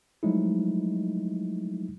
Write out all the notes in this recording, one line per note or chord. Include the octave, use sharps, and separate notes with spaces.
F3 F#3 G#3 A3 D#4 E4